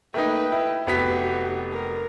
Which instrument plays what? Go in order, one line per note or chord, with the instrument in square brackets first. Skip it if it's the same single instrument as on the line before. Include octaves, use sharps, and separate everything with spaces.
[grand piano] A3 A#3 D#4 [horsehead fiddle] B4 G5
[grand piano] E4
[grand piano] F1 B3 B6 [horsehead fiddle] F#4 G4
[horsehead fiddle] A#4